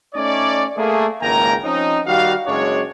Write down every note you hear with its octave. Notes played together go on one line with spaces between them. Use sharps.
A3 C#4 D#4 C#5 D5
A3 A#3 G#4
G#1 C#2 A#3 G5 G#5 A#5
F3 C4 C#4 D#4
D#3 G3 F#4 F5
F#1 F#2 G#3 D4 C#5